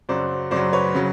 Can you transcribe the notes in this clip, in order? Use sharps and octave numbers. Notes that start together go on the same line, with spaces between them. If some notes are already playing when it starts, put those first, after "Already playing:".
F#2 C#3 F#3 C5 D5
F#2 C#3 F#3 C5 D5
B4 C#5
C#3 F#3